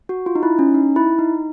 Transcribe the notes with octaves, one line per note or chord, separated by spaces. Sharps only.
F#4
F4
D#4
E4
C#4
D#4
E4
D#4